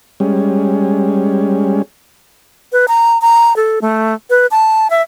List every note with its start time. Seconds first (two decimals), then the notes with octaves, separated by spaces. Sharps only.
0.20 G3 G#3 C#4
2.72 B4
2.88 A#5
3.22 A#5
3.56 A4
3.82 A3
4.30 B4
4.51 A5
4.90 E5